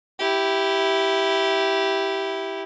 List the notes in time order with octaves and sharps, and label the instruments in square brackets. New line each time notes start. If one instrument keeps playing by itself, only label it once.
[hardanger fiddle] E4 G4